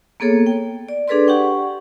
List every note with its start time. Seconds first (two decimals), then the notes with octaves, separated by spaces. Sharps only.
0.20 A#3 B3 G#4 A4 C#5
0.46 G5
0.89 D5
1.08 D4 G#4 A4 B4 D5 C6
1.27 G4 F#5 G5 C#6